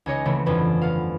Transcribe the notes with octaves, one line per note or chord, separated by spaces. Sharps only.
C#2 D#4 G#4 C#5 D#5 C#7
C#3 E3 A3 B3 C4
G1 F2 B4
B3 F5